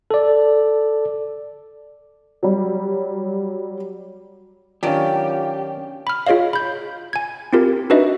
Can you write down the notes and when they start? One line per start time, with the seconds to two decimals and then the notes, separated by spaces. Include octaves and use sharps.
0.11 A4 D5
2.43 F#3 G3
4.83 D#3 F#3 C#4 D4 F4 G4 D5 F5
6.07 B5 F6
6.27 F4 G#4 C#5 D#5 F5
6.53 B5 G6
7.13 G#5 G#6
7.53 C4 E4 F4 G4 A#4
7.90 D4 D#4 F#4 B4 D#5 E5